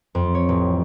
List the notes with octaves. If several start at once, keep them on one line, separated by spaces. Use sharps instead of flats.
F2
C#5
A1